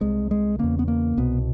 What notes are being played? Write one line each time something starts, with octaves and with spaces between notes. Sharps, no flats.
C2 C3 G#3
G#3
E2 C#3 A#3
B3
A#3
C2 B2 B3